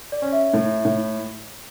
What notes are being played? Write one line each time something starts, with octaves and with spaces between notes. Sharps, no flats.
D5
C#4
E5
A2
A2